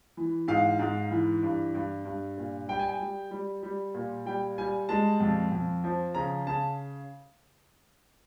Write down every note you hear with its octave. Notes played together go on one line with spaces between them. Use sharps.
E3
G#2 F5
G#2
E3
G2
G2
G2
A#2
G3 G5
G#5
G5
G3
G3
G3
A#2
G3 G5
G3 G#5
G#3 A5
F2
F2
F3
C#3 A#5
C#3 A5